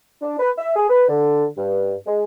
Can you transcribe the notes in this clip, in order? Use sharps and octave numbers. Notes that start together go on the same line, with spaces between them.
D4
B4
E5
G#4
B4
D3
G2
G#3